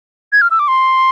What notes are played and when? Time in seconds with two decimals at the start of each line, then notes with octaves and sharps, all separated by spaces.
0.33 G#6
0.42 F6
0.51 E6
0.59 D6
0.68 C6